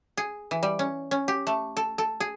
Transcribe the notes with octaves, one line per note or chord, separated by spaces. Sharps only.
G#4
E3
G3
C#4
C#4
G4
A3
A4
A4
G#4